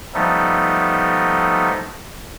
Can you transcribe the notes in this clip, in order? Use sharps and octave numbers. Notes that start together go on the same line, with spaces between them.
F3 G3 A3 B3 D#4 A4